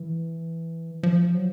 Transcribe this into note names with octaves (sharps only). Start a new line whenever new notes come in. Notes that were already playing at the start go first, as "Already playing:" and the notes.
Already playing: E3
F3
F#3